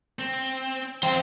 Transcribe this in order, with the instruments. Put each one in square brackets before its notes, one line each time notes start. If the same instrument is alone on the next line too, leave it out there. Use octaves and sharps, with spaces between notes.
[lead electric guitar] C4
[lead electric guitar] F2 C4 [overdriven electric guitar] C5 G5